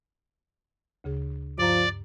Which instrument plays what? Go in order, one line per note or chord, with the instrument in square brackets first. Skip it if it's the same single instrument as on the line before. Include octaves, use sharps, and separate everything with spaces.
[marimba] D2 C#3 G#4
[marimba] G2 A#5 [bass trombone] F3 [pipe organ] D5